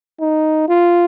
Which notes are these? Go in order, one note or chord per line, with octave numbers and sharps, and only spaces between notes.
D#4
F4